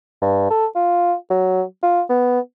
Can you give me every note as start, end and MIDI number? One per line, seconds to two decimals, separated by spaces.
0.22 0.46 43
0.50 0.66 69
0.76 1.14 65
1.30 1.62 54
1.83 2.01 65
2.09 2.40 59